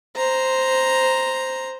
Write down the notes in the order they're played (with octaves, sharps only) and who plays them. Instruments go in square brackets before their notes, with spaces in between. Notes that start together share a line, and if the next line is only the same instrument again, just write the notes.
[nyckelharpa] C5 A#5